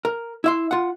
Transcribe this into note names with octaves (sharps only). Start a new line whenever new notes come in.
A#4
E4 E5 C6
F4 F#5